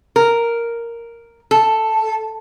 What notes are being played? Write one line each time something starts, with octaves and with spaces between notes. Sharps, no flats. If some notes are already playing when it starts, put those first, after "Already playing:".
A#4
A4